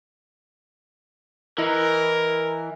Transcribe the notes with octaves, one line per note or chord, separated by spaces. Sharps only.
E3 E4 A#4 D#5